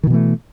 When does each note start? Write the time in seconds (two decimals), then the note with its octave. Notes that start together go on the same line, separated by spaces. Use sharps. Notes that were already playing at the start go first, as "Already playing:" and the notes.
0.03 D#3
0.07 B2
0.10 E3
0.14 A3